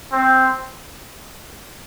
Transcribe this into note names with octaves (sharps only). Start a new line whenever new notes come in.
C4